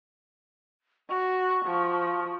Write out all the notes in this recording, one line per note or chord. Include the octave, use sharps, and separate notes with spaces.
F#4 C#6
F3